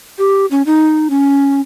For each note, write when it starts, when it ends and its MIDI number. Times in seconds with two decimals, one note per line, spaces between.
0.18 0.46 67
0.51 0.62 61
0.66 1.08 63
1.10 1.61 61